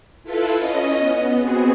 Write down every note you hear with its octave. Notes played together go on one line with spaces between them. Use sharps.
E4 F4 A4 B4
C#4 D#5
B3
B3 C4 F#4 G#4